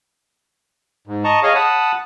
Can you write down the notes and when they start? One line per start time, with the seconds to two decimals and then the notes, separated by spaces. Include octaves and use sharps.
1.07 G#2
1.24 D#5 A5 A#5 C#6
1.43 G#4 C#5 D#5 F5 G#5
1.55 F#5 A5 B5 D#6